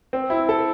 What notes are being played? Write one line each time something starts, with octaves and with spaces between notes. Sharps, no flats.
C4
E4
A4